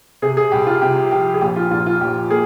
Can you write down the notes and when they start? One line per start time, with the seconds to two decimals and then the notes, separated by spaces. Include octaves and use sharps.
0.22 C3 G#4
0.37 G#4
0.52 C2 G4
0.67 F4
0.82 C3 G4
1.11 F3 G4
1.34 G#4
1.41 A#1 G4
1.56 F4
1.71 A#1 F4
1.86 F4
2.01 A#1 G4
2.31 A#3 G#4